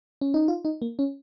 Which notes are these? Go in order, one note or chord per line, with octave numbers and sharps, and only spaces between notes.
C#4
D#4
F4
D#4
A#3
C#4